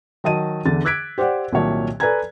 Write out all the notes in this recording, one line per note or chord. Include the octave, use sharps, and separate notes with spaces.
D#3 F#3 D#5 A5 D#7
E2 D3 A6
D6 E6 F#6 G#6 B6 D7
G4 C5 D5 F#5
C2 A#2 D#3 F#3 C#5 A5
A4 B4 D5 G#5 A#5 G#6